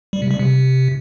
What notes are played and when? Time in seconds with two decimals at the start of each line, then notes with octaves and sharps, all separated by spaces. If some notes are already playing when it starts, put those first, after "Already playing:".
0.13 G3
0.22 C3
0.31 G3
0.39 C3